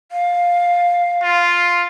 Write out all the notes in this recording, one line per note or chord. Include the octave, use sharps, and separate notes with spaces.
F5
F4